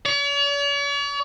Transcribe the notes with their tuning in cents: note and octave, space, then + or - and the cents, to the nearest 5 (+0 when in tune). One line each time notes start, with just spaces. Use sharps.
C#5 +45